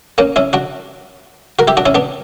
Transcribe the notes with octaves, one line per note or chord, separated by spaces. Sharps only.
A#3 C#4
C#4 E4
D4 F#4
F#4 A#4
E4 G4
D4 F#4
C#4 E4
B3 D4